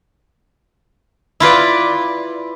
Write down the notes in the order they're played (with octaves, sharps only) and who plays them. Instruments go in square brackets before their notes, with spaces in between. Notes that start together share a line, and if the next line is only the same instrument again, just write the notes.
[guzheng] E4 F4 B4 D5